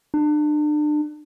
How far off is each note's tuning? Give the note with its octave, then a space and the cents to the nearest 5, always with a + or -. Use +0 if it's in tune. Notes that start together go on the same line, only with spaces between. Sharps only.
D4 +35